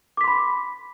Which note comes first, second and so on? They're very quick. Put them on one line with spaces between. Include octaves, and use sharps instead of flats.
D6 B6 C6 B5